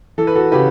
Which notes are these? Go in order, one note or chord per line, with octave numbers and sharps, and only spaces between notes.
E3 A4
B4
F#4 A4
C#3 G4 B4